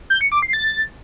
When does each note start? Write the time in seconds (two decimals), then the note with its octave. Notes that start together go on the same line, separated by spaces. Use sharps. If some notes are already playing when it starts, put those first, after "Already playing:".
0.10 G6
0.21 C#7
0.32 D6
0.42 C7
0.53 A6